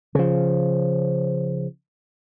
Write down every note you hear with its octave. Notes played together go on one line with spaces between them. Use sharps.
C#3 F3